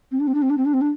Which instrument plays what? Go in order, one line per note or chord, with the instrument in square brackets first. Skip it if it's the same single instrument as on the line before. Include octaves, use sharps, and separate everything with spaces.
[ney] C4
D4
C4
D4
C4
D4
C4
D4
C4
D4